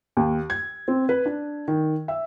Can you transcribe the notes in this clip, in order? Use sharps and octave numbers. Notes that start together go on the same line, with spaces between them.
D#2
G#6
C4
B4
D4
D#3
E5